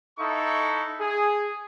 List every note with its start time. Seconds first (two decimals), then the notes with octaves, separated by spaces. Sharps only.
0.18 D#4 E4 A4 F5 C6 C#6
1.00 G#4